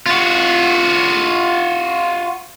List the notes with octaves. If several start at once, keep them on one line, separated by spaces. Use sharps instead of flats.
F4 F#4